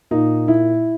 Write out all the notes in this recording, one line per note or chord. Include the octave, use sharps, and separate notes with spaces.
A#2 D#4
E4